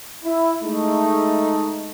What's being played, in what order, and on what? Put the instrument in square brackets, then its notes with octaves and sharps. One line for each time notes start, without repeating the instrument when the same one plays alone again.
[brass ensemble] E4
G#3 A3 D#4